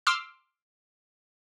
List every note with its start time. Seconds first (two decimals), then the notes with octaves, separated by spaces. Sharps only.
0.07 C6 D6 E6 F6